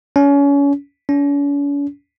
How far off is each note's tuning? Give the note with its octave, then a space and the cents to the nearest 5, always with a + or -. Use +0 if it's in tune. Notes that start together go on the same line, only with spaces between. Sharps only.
C#4 +30
C#4 +45